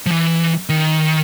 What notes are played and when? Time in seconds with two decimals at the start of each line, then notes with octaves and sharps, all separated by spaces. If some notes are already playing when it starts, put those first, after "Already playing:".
0.06 F3
0.12 E3
0.69 D#3